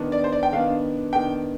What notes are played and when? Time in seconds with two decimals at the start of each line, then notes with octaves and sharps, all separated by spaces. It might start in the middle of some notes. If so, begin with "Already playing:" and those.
Already playing: D#3 B3 D4
0.12 D5
0.24 C5
0.33 D5
0.43 G5
0.52 D#3 B3 D4 F5
1.13 D#3 B3 D4 G5